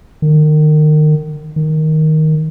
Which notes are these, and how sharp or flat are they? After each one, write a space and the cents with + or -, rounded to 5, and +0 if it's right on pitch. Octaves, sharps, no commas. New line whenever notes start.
D#3 -30
D#3 +5